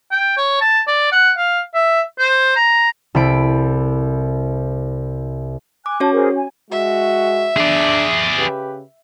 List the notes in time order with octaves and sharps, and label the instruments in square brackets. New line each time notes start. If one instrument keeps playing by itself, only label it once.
[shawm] G5
C#5
A5
D5
F#5
F5
E5
C5
A#5
[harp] C2 A4 B5 D7
[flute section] G#5 F#6 [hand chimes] D6
[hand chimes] C#4 F#4 C#5 [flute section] A5
[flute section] G#4 A#4 C5
G#5
[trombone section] G#3 F#4 [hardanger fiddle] E5
[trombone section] D4 [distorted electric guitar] G#4 D5
[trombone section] C#3 G4 B4